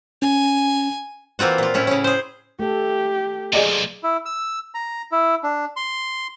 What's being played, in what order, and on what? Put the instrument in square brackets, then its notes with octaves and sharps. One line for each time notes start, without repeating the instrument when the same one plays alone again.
[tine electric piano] C#4 [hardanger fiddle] G#5
[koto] E3 A#3 C4 F4 F#4
A#2 F4
A2 C#4 E4
C#3 C#4
G#4 C5
[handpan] A3 A4 [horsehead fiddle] G4
[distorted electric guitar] B1 A#2 [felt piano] G#4 D5 D#5
[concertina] E4
E6
A#5
E4
D4
C6